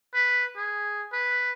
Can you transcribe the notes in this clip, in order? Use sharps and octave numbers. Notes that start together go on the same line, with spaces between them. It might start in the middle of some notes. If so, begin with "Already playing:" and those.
B4
G#4
B4